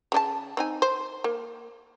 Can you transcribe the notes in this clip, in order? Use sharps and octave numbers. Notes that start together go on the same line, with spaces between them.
C#3 D4 A5
C4 D#4 G#5
C5
A#3